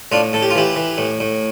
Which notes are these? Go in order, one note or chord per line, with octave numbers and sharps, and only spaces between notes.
A2 D4 F4
A2 A4
G4
F4
E3 E4 G4
E3
A2
A2